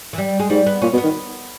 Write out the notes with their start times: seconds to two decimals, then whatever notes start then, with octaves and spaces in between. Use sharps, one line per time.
0.13 E3
0.18 G3
0.40 G#3
0.50 G#2 G3
0.66 B3
0.82 A#2 C#4
0.93 B2
0.98 B3
1.04 D#3